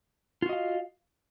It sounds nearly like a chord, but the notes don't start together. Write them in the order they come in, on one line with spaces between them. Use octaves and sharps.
F4 F#4 D#5 F5